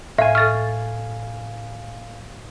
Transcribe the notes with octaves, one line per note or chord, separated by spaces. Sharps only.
A2 E5 F5 G#5
A4 C#6 F6 A6